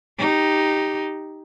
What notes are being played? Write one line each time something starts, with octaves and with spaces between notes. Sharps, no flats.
D#4 G4